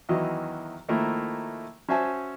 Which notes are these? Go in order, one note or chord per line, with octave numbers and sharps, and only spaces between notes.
E2 D#3 E3 F#3 D#5
D#3 F3 A3 A#3 E4
C#4 F#4 C5 E5 G#5 A5